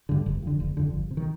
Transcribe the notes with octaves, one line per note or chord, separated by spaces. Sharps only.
G2 D3
F1
F2 D3
F1
F2 D3
G1
C3
D#3